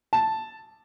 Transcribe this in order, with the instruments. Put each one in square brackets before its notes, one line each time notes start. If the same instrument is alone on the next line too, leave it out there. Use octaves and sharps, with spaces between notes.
[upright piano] A5